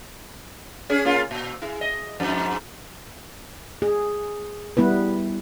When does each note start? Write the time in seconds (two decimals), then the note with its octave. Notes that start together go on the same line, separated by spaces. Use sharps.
0.90 C#4 G#4
1.05 A#3 C#4 F4
1.31 A#2
1.62 E4 G#4
1.81 D#5
2.20 F2 G#2
3.82 G#4
4.77 G3 B3 E4 B4